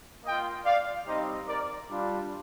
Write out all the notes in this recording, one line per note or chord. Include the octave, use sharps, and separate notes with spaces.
A#3 F4 D#5 G5
D5 F5
G3 C4 D#4 G4 C5 D#5
A#4 D5
G3 D4 F4